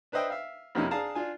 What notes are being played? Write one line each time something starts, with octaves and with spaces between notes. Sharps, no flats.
D4 B4 C5 D#5 E5 G5
E5 F5
F2 C3 A#3 C#4 D#4 E4
D4 G#4 F5 A5 A#5
D4 F4 G#5